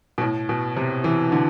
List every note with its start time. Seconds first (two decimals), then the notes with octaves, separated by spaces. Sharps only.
0.18 B2
0.21 A2
0.49 B2
0.76 C3
1.04 E3
1.32 D3